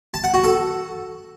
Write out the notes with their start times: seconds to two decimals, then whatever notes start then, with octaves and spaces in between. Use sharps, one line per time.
0.14 A5
0.24 F#5
0.34 F#4
0.44 A4